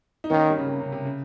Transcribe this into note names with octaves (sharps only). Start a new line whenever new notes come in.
D#4
D#3 A#3 C#4
G3 A#3
C#3
C3
C#3
C3
C#3